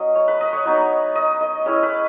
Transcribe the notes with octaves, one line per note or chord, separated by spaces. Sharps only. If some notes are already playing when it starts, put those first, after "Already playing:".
Already playing: F#3 C#4 D#5
C#5
B4
D#5
C#5
F#3 B3 D#4
D#5
D#5
G#3 C#4 E4 C#5
B4